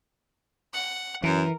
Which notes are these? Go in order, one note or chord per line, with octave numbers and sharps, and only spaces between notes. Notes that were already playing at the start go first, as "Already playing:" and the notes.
F#5
F#2 E3 A#4